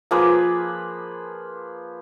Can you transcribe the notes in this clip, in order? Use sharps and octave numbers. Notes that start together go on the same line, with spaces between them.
F3 A#3 G#4 B4